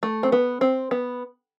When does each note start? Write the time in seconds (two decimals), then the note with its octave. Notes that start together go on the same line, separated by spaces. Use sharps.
0.03 A3
0.23 C4
0.32 B3
0.61 C4
0.91 B3